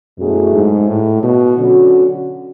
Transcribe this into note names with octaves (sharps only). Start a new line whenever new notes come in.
F#2 B2 F#3 A3 E4 G#4
G#2
A2
B2
D3 F#3 C#4 F#4